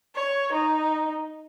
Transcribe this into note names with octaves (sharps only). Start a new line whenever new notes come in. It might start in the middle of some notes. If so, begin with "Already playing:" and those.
C#5
D#4